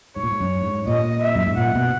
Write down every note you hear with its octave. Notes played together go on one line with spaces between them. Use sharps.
G#2 C#5
A#2
G#2
F#2
G#2
A#2 D#5
E5
F#2
G#2
A#2 F#5
B2